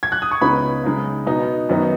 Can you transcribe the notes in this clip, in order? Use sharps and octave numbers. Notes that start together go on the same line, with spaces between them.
G#6
F#6
D#6
C#6
C#2 C#3 B3 D#4 B5
C#3 G#3 D#4
B2 B3 D#4
F#2 D#3 B3 D#4